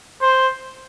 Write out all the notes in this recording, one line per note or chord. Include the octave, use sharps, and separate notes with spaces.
C5